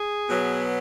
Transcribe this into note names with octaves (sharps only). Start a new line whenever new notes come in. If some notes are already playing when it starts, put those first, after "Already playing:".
Already playing: G#4
B2 F#3 B3